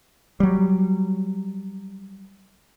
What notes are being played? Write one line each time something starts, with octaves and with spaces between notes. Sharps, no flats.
F#3 G3